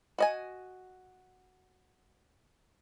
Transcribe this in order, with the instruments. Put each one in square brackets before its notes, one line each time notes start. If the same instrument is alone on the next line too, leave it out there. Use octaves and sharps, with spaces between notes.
[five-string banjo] F#4 D#5 G#5